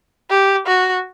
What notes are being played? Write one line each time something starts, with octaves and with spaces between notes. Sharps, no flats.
G4
F#4